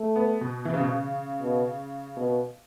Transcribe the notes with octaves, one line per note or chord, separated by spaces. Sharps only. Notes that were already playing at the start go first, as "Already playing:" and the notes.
Already playing: A3
B3
B2
E3
C#3
B2
C#3
B2
B2